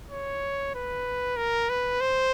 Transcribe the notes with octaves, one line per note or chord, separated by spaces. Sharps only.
C#5
B4
A#4
B4
C5